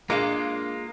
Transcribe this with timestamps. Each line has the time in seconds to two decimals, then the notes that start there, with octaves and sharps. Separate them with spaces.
0.10 G#3 A#3 D4 F4 F5